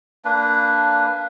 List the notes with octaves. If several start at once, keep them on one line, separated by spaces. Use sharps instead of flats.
A#3 D4 B4